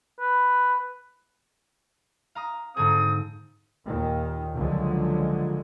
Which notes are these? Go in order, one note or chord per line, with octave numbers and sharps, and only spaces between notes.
B4
F5 A#5 D#6
G#2 D3 C4 G#4 A4 D#6
D#2 A#2 D#3
C#2 D3 F3 F#3 G#3